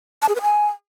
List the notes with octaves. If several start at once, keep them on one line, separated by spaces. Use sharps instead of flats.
A5
G#4
B4
G#5